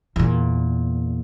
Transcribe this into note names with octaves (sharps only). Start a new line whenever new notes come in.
E2 A#2